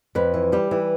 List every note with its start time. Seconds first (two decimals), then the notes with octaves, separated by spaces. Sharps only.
0.15 F2 B4
0.34 E3
0.52 G3 G4
0.71 E3